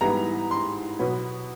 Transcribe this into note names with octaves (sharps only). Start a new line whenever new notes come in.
G#2 E3 G3 B3 A#5
C6
B2 F#3 B3